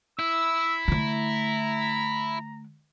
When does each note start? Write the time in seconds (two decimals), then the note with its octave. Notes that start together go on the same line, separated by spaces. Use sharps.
0.19 E4 E6
0.88 D3 A3 A#5